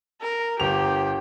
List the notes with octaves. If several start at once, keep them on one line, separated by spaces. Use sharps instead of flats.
A#4
G1 G4 F7